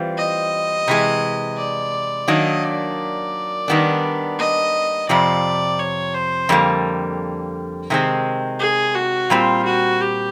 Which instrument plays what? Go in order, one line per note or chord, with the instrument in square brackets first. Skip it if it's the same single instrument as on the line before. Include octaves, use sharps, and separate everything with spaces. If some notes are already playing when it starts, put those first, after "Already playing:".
Already playing: [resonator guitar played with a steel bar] E3 G3 C4 F4
[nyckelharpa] D#5
[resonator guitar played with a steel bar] C3 E3 G#3
[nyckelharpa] D5
[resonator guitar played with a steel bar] D#3 F#3 A#3 D4 [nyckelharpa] D#5
[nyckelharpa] D5
[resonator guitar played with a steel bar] D#3 G3 B3 D4
[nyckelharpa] D#5
[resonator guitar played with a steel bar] F2 C3 F3 [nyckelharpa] D5
[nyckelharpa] C#5
C5
[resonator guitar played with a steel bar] F2 D3 G3 A#3
C3 D#3 G#3 C4
[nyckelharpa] G#4
F#4
[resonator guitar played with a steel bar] A#2 G3 C4 [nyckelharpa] F4
[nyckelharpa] F#4
G4